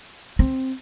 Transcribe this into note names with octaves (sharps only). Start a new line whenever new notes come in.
C4